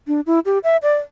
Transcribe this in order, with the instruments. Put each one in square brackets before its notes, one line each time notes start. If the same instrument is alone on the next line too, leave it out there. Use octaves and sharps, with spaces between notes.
[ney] D4
E4
G4
E5
D5